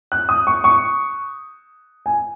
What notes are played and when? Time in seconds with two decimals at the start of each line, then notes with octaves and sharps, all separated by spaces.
0.12 F#6
0.29 D#6
0.47 C#6
0.64 C#6
2.06 G#5